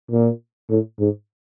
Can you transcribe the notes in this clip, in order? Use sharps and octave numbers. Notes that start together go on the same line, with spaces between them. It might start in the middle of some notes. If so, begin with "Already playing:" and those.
A#2
A2
G#2